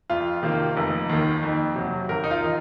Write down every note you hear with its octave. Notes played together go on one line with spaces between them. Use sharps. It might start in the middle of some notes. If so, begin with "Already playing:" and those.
F2 F4
C3 D#3 A#3
F1
D#2 D#3
F2
C3 F#3
G#1 A#4
D#4
F4
D#3